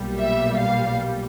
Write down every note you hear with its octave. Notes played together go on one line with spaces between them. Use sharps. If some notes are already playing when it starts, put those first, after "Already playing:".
Already playing: B1 A#2 G3
E5
F5